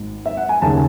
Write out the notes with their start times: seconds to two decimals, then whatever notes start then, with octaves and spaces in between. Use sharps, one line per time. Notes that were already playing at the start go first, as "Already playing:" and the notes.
Already playing: G#1 G#2
0.26 E5
0.37 F#5
0.49 G#5
0.62 D#2 C#3 G#3 A5